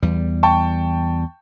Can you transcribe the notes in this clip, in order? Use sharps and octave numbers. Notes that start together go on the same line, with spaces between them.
E2 G3
G5 A5 C#6